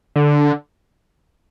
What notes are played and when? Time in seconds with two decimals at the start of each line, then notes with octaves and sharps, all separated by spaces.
0.16 D3